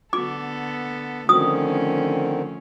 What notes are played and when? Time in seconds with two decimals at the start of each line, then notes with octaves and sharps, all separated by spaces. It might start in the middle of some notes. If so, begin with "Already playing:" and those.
0.13 D3 B3 A4 D6
1.29 D3 D#3 F3 A3 C4 C#4 D#6